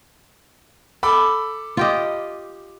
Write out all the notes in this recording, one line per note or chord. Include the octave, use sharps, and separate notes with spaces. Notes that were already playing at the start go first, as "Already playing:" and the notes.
A4 B5 D6
F4 G4 D#5